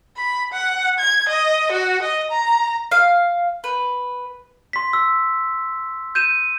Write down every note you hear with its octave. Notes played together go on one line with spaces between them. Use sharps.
B5
F#5
G#6
D#5
F#4
D#5
A#5
F5
B4
C6 B6
E6
G6 D#7 E7